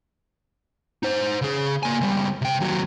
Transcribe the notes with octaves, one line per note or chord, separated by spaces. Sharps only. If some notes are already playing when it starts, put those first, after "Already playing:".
D#4 C5
C#3 G#4
A#3 G#5
C#2 G3
C3 G5
D#2 F#3